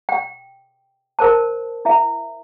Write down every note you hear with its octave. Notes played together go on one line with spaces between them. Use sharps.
G5
A#4 C5 A5
E4 E5